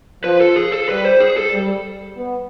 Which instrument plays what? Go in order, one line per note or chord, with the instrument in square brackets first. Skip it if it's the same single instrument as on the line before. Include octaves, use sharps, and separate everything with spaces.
[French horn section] F3 [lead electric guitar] B4
[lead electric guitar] A4
G#4
A4
[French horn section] G3 [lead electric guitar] B4
[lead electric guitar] C5
G#4
A4
[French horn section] G3
B3